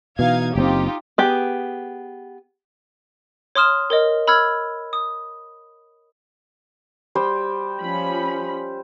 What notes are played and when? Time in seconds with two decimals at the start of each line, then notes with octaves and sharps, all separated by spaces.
0.19 B2 E3 D#4 F5 G#6
0.55 F#1 C3 C4 D#4 F4 G4
1.18 B3 G4 G#4
3.55 C#5 C6 D#6 F6 E7
3.90 A#4 C#5 D#5
4.28 B5 E6 F6 G#6
4.93 D#6
7.15 G3 C5 G5
7.80 F3 C#4 B5